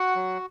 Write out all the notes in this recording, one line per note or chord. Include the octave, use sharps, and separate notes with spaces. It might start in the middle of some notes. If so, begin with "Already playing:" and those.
Already playing: F#4 F#5
F#3